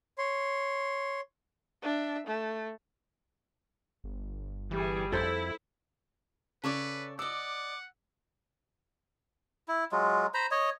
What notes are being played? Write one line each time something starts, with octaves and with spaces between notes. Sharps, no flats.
C#5 C6
D4 E5
A3
G1
E3 G3 G#4
F2 E4 A4 C5
C#3 A4 B4 C#5 D5
D5 D#5 F#5 D6 E6
E4
F#3 G#3 F4
C5 A#5 B5
C#5 D#5